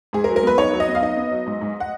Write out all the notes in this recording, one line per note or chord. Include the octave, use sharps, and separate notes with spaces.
G#2 G#4
A#4
F#3
A#4
B3 B4
D#4 C#5
F#3
D#5
B3
F5
D#4 D#5
B3
F#3
G#2
G#2
F#5